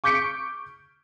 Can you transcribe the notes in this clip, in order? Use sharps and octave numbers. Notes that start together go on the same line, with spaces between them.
C#6 D6 G6 B6 C#7 D7